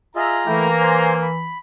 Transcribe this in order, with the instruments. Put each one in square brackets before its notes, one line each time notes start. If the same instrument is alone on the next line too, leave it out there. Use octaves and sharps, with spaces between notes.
[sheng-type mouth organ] F4 G#4 D#5 [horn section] E5 [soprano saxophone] A#5
[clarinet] E3 [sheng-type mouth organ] A3 E4 G5 [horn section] A#3
[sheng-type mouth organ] C5 G#5 C6
B5